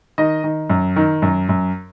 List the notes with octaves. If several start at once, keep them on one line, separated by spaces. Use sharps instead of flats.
D#3 D#5
D#3
F#2
D#3
F#2
F#2